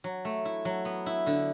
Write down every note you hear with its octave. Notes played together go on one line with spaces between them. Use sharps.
F#3
A3
E4
F#3
B3
E4
D3